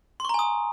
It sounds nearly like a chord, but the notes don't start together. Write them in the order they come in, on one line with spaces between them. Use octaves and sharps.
C6 C#6 A#5 G#5 D#6